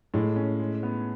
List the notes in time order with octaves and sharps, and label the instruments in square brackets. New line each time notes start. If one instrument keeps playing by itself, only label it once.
[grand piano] A2 [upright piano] G#3
[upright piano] C#4
G#3
B3